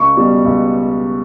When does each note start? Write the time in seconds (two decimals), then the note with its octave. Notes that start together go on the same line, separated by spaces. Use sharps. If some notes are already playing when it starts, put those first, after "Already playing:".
Already playing: C#2 C#6
0.17 B2 G3
0.45 C#2